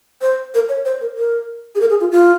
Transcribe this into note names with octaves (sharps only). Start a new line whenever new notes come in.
C5
A#4
C#5
C5
A#4
A#4
G#4
A#4
G#4
F4
F4